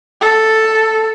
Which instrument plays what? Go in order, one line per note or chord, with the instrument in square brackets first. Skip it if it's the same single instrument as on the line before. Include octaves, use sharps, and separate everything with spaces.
[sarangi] A4